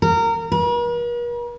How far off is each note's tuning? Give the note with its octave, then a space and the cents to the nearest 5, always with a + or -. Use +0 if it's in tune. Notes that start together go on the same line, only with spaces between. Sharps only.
A#4 -25
A#4 +45